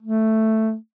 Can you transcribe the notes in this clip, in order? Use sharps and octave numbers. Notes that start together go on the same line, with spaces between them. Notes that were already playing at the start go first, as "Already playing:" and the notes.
A3